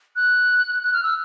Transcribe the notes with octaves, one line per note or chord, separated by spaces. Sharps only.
F#6
F#6
F6
E6